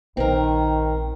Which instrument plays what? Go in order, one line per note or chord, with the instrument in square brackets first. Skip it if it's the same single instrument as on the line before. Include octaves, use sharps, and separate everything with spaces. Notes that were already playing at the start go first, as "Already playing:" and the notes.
[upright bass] A#1 [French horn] D#3 [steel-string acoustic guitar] C4 A#4